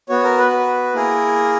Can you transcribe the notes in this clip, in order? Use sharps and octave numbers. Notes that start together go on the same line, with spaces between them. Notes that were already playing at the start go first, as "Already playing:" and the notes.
B3 F#4 C#5
A#4
B4
B4
A#3 E4 G#4 A#4